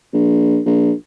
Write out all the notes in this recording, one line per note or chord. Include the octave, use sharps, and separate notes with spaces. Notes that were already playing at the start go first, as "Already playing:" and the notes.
A#1
A#1